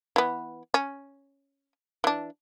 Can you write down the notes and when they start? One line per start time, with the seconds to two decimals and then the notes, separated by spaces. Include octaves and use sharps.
0.16 E3 B3
0.74 C#4
2.04 E3 D4